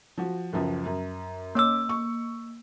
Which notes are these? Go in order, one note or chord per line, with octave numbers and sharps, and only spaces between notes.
F3 F#4
C#2 F#2 F3
F#2
A#3 C#4 D6 E6
C#6